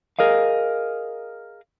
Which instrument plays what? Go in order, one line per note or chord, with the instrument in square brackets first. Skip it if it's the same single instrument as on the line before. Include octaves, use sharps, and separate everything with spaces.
[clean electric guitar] G#4 A#4 D#5 F5